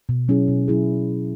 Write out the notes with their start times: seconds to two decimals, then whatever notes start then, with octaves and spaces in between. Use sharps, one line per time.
0.09 B2
0.28 F#3 C#4 E4 G#4
0.48 B2
0.68 F#3 C#4 E4 G#4